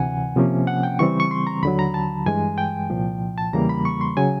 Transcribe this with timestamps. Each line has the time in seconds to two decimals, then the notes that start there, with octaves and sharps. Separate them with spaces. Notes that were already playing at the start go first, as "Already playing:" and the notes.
Already playing: D2 C3 E3 F#5 G#5
0.36 C3 F3 A#3 C#4
0.67 F#5
0.83 G5
0.99 C#3 E3 G3 C4 C#6
1.20 C#6
1.31 C6
1.47 A#5
1.63 D#2 D3 F#3 B5
1.79 A#5
1.94 A5
2.26 G2 E3 G#3 G#5
2.58 G5
2.90 C2 A#2 F3
3.38 A5
3.53 E2 C#3 E3 G3 A#3 A#5
3.69 B5
3.85 C#6
4.01 C6
4.17 C#3 F#3 G#5